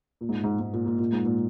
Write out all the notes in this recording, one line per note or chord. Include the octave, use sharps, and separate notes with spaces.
A#2
G#2
G#2
G#2
A#2
A#2
A#2
G#2
A#2